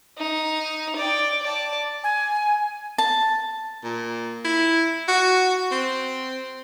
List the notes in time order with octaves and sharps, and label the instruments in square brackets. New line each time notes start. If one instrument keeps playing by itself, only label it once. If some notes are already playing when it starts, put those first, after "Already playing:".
[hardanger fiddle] D#4
D5 G5
D5 A5
[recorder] G#5
[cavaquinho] A5
[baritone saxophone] A#2
E4
F#4
C4